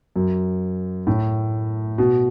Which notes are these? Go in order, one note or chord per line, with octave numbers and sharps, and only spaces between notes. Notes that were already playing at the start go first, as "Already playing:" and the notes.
F#2
A2
B2